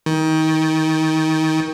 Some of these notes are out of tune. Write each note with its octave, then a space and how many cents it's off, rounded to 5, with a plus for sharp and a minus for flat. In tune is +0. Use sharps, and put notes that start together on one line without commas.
D#3 +25